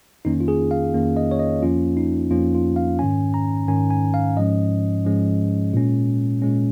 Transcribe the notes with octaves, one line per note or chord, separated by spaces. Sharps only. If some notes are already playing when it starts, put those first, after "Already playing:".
F2 D#3 A#3 C#4 D#4
F4
G#4
F5
F2 D#3 A#3 C#4
D#5
C#5
D#5
F2 F3 A#3 C#4 F4
D#4
F2 F3 A#3 C#4 F4
F4
F5
G#2 D#3 C#4 G#5
A#5
G#2 D#3 C#4 G#5
G#5
F5
G#2 F3 G#3 C#4 D#5
G#2 F3 G#3 C#4
A#2 G#3 C#4
A#2 G#3 C#4